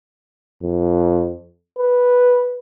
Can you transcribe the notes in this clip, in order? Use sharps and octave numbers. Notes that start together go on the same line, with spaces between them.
F2
B4